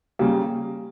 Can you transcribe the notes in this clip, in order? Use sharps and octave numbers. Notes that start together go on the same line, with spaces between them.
C#3 G3 A#3